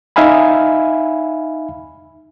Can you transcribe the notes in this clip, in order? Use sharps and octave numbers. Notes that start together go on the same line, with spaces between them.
D#4 E5 F5 G#5 B5